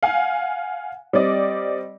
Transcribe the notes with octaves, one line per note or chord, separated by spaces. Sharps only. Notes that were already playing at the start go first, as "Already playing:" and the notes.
F5 F#5 G#5
G3 C4 D5 D#5